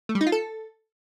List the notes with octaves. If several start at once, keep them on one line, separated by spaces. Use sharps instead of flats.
A3
G3
D#4
F4
A4